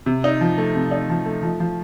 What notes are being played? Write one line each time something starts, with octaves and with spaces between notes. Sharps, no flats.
C3
D#4
F3
A3
C3
D#4
F3
A3
F3
F3